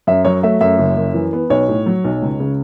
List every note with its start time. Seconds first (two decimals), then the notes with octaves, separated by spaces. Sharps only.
0.07 F#2 E5
0.25 F#3 C#5
0.43 A3 E5
0.61 F#2 E5
0.79 F#1
0.97 F#2
1.14 E3
1.33 B3
1.50 B1 C#5
1.68 A2
1.86 F#3
2.04 B1
2.22 C#2
2.40 C#3